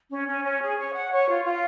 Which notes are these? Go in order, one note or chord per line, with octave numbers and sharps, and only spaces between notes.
C#4
C#4
C#4
G#4
C#5
F#5
C#5
F4
F4